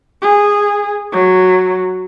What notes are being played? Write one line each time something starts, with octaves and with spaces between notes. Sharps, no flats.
G#4
F#3